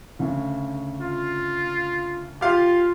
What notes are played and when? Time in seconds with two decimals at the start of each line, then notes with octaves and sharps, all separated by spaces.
0.19 D2 C#3
1.00 F4
2.41 F4 G4 F5